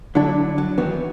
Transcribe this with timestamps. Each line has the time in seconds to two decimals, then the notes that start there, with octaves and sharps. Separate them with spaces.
0.15 D3 F#3 D4 E4
0.58 F#3
0.78 D#3 E3 F#3 B3